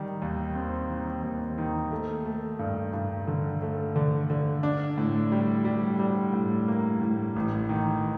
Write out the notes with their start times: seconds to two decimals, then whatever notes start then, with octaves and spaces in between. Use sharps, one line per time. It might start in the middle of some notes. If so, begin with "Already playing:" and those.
Already playing: D#3 G3
0.22 D#2
0.55 C4
0.89 D#3
1.23 D#2
1.58 D#3
1.92 A3
2.26 A3
2.59 G2
2.93 G2
3.27 D3
3.62 A3
3.96 D3
4.30 D3
4.63 D4
4.98 A2
5.32 G3
5.65 G3
5.99 G3
6.33 A2
6.68 A#3
7.01 A2
7.36 A1
7.69 D#3